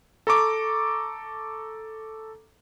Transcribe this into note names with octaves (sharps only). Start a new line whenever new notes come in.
A4 A#5 C#6 D6